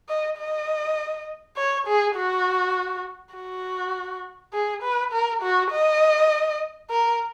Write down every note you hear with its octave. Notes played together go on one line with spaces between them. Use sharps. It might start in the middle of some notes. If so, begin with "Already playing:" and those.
D#5
D#5
C#5
G#4
F#4
F#4
G#4
B4
A#4
F#4
D#5
A#4